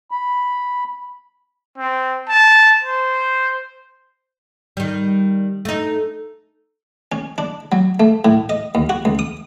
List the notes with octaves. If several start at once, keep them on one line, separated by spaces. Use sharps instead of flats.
B5
C4
A5
C5
D#3 G3
A3 D#4
C#4
D4
F#3
A3
A2
D#5
D#2
F#4
C#2
D#6